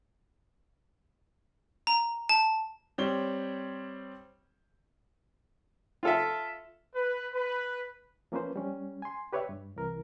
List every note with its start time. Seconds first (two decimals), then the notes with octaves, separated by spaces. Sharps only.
1.87 A#5
2.29 A5
2.98 G3 C4 C#5 G7
6.03 F4 A4 E5
6.94 B4
7.34 B4
8.32 F3 A#3 C#4 B4 C5
8.56 G3 C#4
9.02 G#5 C6
9.33 G4 B4 C#5 D5 E5
9.49 G2
9.76 C2 E3 A#4